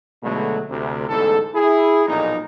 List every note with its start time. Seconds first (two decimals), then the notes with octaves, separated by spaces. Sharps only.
0.23 C#2 B2 D3 F#3 G#3 A3
0.70 D2 C3
1.08 A1 E2 G#2 D3 A4
1.54 E4 G#4
2.06 B1 F2 A#2 D#4